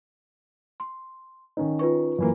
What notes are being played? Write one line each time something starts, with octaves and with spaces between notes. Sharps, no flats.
C6
D#3 C#4 D#4
F4 B4 C#6
F#2 E3 A#3